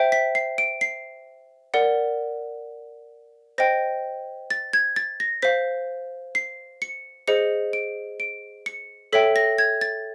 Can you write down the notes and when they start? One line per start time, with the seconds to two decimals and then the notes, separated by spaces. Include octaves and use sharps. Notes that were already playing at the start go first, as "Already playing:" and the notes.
Already playing: C5 E5 G5
0.12 B6
0.35 C7
0.58 D7
0.81 C7
1.74 A#4 D5 F#5
3.58 C5 D#5 G5 A#6
4.51 A6
4.73 G#6
4.96 A6
5.20 A#6
5.42 C5 F5 B6
6.35 C7
6.82 C#7
7.28 G#4 C5 D#5 C#7
7.73 D7
8.20 D7
8.66 C#7
9.13 A4 C#5 E5 G5 B6
9.36 A#6
9.58 G#6
9.81 A6